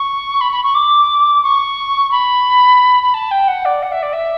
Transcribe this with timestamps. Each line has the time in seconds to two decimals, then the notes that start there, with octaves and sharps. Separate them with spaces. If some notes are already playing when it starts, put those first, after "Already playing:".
Already playing: C#6
0.41 B5
0.52 B5
0.63 C#6
0.74 D6
1.43 C#6
2.11 B5
3.03 B5
3.14 A5
3.31 G5
3.48 F#5
3.65 D5
3.82 F#5
3.92 E5
4.02 D5
4.13 E5